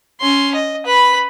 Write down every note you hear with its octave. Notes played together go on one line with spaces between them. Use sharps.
C#4 C6
D#5
B4 B5